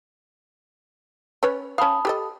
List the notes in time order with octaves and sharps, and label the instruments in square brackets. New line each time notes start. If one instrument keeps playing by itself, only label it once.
[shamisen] C#4 B4 C#5
[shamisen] C#4 F5 [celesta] A5 B5 D#6
[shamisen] G4 A4 D#5